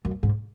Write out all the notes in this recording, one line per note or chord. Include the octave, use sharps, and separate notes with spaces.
F#2
G#2